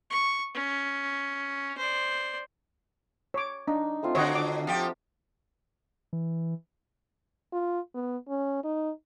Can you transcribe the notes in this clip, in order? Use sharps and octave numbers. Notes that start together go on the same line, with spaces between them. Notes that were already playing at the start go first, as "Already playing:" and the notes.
C#6
C#4
C5 D5
C#5 D6
D4 D#4
A3 C4 F4
D3 F#4 C#5 D#5 F#5
D6
F3 G4
E3
F4
B3
C#4
D#4